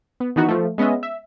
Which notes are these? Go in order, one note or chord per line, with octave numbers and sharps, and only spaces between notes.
B3
D#3 E3 B3 D#4 F#4
F3 A3
G#3 B3 C#4 D#5 E5
E5